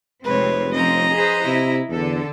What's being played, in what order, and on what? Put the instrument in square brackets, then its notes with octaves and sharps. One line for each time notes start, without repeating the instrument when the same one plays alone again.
[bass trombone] F1 [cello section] C3 G#3 C4 [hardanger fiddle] B4 C#5
[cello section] F3 C4 C#4 [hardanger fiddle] D#5 A#5
[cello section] G#4 B4 C5
[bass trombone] C3 [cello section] E4
[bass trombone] E2 [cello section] D3 A4